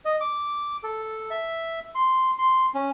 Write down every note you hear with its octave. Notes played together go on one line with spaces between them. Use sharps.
D#5
D6
A4
E5
C6
C6
C#4